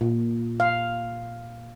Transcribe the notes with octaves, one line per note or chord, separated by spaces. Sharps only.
A#2
F5